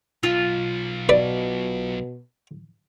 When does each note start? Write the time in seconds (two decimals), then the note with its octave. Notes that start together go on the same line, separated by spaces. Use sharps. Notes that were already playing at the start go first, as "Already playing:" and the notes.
0.23 B1 F4
1.09 B2 B4 D5